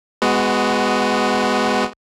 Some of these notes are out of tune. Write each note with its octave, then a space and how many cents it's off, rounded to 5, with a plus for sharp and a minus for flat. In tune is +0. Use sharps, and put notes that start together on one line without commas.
G#3 +0 B3 +20 F#4 +0